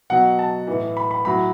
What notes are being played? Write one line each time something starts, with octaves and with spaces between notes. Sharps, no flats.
B2 F#3 F#5
A5
A2 E3
B5
B5
A2 F#3 B5